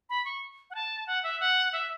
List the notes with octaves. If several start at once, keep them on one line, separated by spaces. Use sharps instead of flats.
B5
C#6
F#5
A5
F#5
E5
F#5
E5